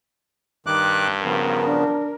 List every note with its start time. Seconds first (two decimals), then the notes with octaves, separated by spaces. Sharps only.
0.67 G2 D#3 D6 F#6
1.24 C#3 F3 B3 A#4
1.68 D4